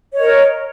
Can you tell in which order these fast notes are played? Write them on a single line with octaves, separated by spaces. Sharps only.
C#5 D#5 A#4